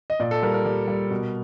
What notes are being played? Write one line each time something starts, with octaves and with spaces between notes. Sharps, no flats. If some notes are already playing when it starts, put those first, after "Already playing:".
D#5
A#2 D5
A4
G3 A#4
A#4
G3
G3
B2